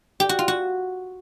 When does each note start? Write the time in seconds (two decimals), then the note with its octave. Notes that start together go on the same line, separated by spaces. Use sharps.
0.20 G4
0.29 F#4
0.39 F4
0.48 F#4